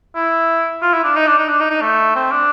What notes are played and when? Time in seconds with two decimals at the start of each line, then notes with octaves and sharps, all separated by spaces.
0.15 E4
0.82 F4
0.94 E4
1.04 D4
1.16 D#4
1.27 D4
1.38 D#4
1.48 D4
1.60 D#4
1.71 D#4
1.81 A3
2.15 C4
2.32 D4